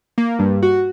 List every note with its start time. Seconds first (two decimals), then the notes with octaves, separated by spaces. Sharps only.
0.18 A#3
0.39 G2
0.62 F#4